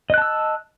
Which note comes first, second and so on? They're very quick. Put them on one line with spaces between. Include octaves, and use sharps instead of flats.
D#5 F#6 A5 E6